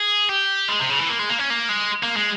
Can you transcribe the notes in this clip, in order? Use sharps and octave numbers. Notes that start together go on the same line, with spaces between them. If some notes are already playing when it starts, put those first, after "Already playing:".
Already playing: G#4
G4
G#3
C3
C#3
E3
A#3
G#3
A#3
C#4
A#3
G#3
A#3
G#3